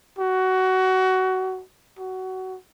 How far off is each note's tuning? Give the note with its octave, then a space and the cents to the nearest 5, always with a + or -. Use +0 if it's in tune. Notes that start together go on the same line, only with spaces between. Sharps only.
F#4 +20
F#4 +20